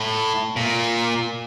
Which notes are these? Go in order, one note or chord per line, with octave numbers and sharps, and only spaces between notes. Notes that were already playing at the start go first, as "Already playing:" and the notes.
Already playing: A2
A#2